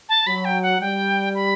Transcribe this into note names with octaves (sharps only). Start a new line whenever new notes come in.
A5
F#3 B5
G5
F#5
G3 G5
B5